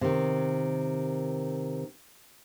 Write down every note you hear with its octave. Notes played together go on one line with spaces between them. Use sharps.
C3 D#3